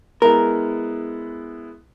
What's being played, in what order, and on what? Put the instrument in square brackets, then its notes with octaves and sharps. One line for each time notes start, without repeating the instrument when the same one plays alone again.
[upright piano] G#3 B3 E4 [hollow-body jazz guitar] A#4